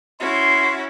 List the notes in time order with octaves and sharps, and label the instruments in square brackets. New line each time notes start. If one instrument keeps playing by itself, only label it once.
[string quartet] C#4 E4 F#4 [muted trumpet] C6